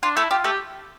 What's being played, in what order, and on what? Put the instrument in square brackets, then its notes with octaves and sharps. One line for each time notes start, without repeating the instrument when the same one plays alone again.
[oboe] D4 [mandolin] F4
[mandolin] A3 A4 [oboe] E4
[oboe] F4 [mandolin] G4
[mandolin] A3 A4 [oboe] G4